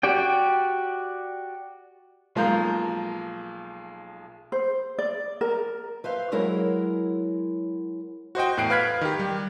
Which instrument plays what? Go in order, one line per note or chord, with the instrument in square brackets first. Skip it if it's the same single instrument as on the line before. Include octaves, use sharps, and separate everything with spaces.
[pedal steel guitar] F#4 G4 D5 G5
[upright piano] B1 F3 G#3 A#3 A#5 G6
[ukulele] C5
D5
A#4
[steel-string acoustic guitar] B4 C5 E5 F5
F#3 G#3 E4 A#4 C#5 F#5
[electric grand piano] F#4 C5 D#5 G5
E2 A2 F#6 C7 D7
B4 F5 F6 F#6 G#6 B6
D#3 G4
G3